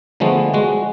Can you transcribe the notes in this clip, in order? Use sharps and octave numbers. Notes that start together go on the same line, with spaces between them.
D3 F3 G#3 A3 B3
G#3 F#4